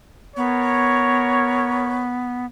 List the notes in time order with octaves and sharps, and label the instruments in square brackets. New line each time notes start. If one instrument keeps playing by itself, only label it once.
[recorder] B3 [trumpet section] A#4 C#5